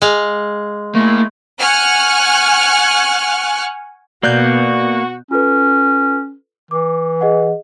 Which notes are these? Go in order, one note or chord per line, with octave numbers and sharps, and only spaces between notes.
G#3 F5
A3 A#3 E4
F#5 G#5 C#6 F6 F#6
B2 A#3 B3 F#4 D5 F#6 G6
C#4 F4 A4 B4
E3 D6
G#4 D#5 F#5